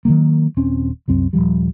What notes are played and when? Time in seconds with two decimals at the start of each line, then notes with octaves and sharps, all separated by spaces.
0.05 D#3 E3 F#3 A#3
0.57 D#1 C4 C#4
1.08 C2 F#2 C4
1.33 D#1 F#2 F3 G3